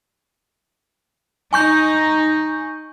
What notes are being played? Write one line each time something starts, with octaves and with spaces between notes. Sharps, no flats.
D#4 G#5 C#6 G6